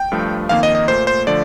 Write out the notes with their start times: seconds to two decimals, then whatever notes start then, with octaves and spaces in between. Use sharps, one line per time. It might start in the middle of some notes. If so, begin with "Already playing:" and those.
Already playing: G5
0.12 G2 F3 A3
0.49 F2 D#3 A#3 F5
0.63 D#5
0.75 D#5
0.88 A#2 A3 C5
1.07 C5
1.27 D3 F3 A3 D5